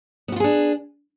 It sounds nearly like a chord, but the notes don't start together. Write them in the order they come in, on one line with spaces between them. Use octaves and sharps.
B3 F#4 F4 G#4 D4